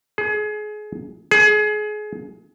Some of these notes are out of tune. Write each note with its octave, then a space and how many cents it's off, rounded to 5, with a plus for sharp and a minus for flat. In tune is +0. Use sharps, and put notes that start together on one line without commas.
G#4 +30
G#4 +30